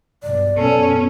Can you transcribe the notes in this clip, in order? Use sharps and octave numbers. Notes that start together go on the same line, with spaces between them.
B1 G2 D5
F#2 B2 B3 C#4 A4